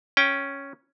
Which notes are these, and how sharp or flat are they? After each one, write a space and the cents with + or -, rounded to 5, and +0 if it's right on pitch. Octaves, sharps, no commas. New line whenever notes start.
C#4 +0 G5 +0